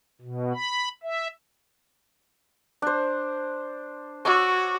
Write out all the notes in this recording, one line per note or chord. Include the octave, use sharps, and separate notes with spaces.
B2
B5
E5
D4 C5
F#4 C#5 D6 E6